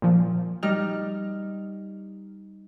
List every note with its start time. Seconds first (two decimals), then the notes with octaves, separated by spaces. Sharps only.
0.02 A#2 F3
0.63 G3 D#4 F6